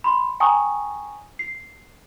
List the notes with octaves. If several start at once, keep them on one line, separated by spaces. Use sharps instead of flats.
B5 C6
G5 G#5 A#5 C#6 D#6
C7